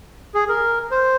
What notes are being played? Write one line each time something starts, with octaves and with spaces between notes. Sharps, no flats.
G#4
A#4
C5